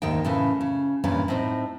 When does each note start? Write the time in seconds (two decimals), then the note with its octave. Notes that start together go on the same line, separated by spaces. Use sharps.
0.02 D#2 G#2 D#3 A3 G5
0.25 A2 C#3 E3 A3
0.61 C#3
1.04 E2 G2 A#2 E3 C#4
1.28 A2 C4 D#4